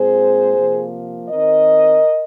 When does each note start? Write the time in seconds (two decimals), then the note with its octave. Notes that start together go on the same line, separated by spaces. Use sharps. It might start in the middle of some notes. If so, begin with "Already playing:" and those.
Already playing: A#2 G#3 C4 G#4 C5
0.57 C3 F3 A#3
1.29 D#3 C4 A#4 D#5